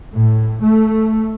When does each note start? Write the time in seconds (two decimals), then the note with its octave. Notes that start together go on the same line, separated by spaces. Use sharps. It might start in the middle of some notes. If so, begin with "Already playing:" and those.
0.12 A2
0.62 A3